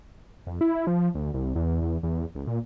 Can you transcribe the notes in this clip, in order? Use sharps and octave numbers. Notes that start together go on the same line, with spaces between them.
F2
E4
F3
D2
C2
E2
E2
E2
C#2
A#2